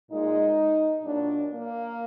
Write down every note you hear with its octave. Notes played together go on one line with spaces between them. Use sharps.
A#2 G#3 D#4
A#2 F#3 D4
A#3